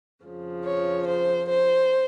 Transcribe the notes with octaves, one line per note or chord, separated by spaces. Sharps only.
F2 C#3 F3
C#5
C5
C5